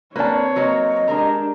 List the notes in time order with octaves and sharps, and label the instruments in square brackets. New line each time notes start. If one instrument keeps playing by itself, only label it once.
[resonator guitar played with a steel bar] A#3 D4 [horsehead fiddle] C4 C#5 [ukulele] B4 A5
[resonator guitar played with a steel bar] F#3 A#3 [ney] D#5
[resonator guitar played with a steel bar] G#3 A#4 A#5 [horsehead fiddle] D4 G4